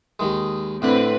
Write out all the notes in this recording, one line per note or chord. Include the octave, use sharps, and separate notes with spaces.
D#2 D#3 G#3
A2 D3 C4 D4 B4